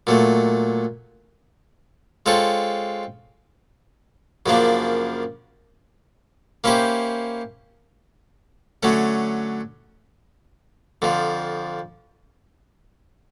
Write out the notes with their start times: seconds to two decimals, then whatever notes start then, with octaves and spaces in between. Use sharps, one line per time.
0.07 A#2 F#3 A3
2.26 G#3 C4 F4 A4 C#5
4.46 F#2 C#3 F3 A#3 D4
6.64 A#3 C#4 E4 G4 C5
8.83 D3 F#3 A3 C#4
11.02 F2 D3 F3